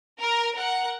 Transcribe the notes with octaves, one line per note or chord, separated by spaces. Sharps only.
A#4
A#4 F#5